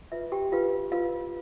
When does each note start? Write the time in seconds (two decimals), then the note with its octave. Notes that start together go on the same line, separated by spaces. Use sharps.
0.12 F4 B4 E5
0.32 G4 G5
0.52 D4 F4 G4 B4 F5
0.92 F4 B4 F5